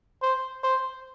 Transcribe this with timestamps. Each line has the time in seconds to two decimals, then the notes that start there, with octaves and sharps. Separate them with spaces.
0.22 C5
0.64 C5